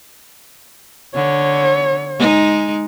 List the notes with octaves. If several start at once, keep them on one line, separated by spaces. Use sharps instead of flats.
D3 C#5
G#3 D#4